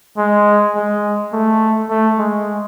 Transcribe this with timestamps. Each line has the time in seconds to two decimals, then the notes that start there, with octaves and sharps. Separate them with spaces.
0.18 G#3
0.75 G#3
1.33 A3
1.89 A3
2.19 G#3